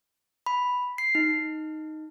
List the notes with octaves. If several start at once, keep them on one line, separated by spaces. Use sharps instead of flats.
B5
C7
D#4